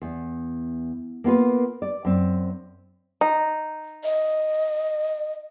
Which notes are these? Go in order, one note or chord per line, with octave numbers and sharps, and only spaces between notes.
E2
A#3 B3 F4 B4
D5
F#2 C4
D#4
D#5